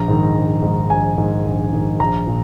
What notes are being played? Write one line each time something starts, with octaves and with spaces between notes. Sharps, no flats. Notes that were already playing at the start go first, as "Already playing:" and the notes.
Already playing: A#1 A#5
G#2 D#3
A#1
G#2 D#3
A#1 G#5
G#2 D#3
A#1
G#2 D#3
A#1 A#5
A#2 F3